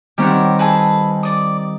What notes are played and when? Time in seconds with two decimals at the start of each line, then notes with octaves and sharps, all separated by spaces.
0.18 D#3 G3 C4 G4 C#5 F#5
0.59 G#4 A4 B4
1.23 D5 D#6